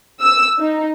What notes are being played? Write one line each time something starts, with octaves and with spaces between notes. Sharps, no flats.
E6
D#4